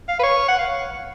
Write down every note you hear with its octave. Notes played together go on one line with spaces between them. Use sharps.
F5
B4
C#5
F#5
F5